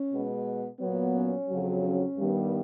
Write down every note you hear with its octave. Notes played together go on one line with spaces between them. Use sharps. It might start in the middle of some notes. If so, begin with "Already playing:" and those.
Already playing: C#4
B2 G#3 B3
A#2 F#3 B3
C#4
F2 C#3 F#3
C#4
G2 D#3 G3 B3